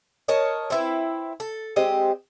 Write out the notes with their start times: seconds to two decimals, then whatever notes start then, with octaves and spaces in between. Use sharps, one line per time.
0.28 A#4 C#5 D#5 A5
0.70 C4 E4 B4
1.40 A4
1.76 G#3 C4 G4 D#5